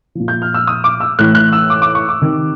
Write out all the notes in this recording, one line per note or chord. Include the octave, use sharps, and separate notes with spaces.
A#2 F3
G6
F6
E6
D#6
D6
E6
A2 E3 F#6
F#6
E6
D6
D6
C#6
D6
C3 D#3